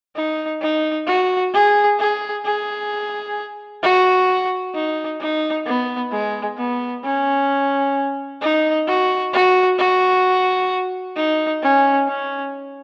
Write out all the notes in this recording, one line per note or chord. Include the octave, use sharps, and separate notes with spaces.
D#4
D#4
F#4
G#4
G#4
G#4
F#4
D#4
D#4
B3
G#3
B3
C#4
D#4
F#4
F#4
F#4
D#4
C#4
C#4